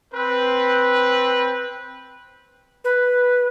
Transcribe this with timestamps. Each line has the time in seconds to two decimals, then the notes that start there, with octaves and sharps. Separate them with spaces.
0.14 C4 B4
2.84 B4